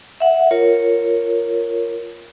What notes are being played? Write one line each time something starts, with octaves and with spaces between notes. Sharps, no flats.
E5 F#5
F4 A#4 C#5